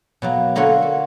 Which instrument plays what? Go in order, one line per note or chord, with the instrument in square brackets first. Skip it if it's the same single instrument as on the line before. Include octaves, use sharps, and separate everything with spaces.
[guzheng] B2 F#3 A#3
D3 A#3 F4 A4 C#5 F#5
F#4